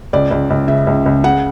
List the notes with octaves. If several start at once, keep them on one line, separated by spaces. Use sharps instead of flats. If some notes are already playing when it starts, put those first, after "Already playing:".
C#2 D5
C#2
C#2
C#3 E5
C#2
C#2
C#3 F#5